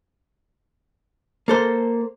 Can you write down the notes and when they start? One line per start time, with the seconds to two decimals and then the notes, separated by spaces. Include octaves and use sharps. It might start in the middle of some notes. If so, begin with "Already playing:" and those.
1.48 A#3 A4 C5